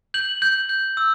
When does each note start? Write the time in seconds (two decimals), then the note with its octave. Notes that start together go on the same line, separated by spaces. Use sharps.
0.14 G6 F#7
0.42 G6
0.69 G6
0.97 E6